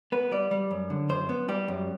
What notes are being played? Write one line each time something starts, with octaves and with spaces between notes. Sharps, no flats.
B3 B4
G3 D5
G3
F#2
D3
F#2 C5
B3
G3 G4
F#2